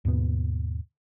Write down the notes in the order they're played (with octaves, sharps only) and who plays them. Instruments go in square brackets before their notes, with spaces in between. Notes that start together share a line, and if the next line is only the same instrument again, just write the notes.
[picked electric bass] D#2 G#2 B2 B3